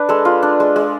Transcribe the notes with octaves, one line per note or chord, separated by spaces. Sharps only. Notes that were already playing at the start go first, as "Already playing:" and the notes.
Already playing: D4 B4
G#3 A4
F4
D4
G#3
G#3